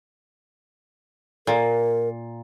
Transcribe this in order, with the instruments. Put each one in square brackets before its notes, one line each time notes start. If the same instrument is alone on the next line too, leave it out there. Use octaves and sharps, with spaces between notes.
[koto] A#2 [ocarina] A#4